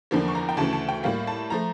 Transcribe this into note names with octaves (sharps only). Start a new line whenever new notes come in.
E2 D3 F3 A#3
C#6
A#5
G5
D2 C#3 E3 A3 A5
A5
G5
A2 G3 A#3 F5
A5
F3 A3 A#5